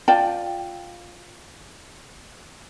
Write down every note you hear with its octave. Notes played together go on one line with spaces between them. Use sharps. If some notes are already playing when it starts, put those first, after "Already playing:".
F4 D5 G5 A5